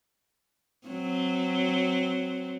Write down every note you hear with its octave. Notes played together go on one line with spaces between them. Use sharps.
F#3 C4